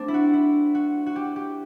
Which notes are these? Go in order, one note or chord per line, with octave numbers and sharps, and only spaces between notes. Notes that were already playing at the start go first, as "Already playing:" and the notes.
Already playing: A3 C4 D4
E4
F#4
E4
F#4
F#4
G4
G4